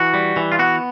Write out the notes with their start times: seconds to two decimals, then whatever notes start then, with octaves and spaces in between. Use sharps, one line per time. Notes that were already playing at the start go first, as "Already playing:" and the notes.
Already playing: E3 F#4
0.14 G3
0.36 E3
0.52 F4
0.59 B3 F#4